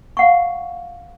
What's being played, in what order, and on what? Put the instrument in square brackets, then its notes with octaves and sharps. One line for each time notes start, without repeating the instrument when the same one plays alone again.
[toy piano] F5 F#5 C#6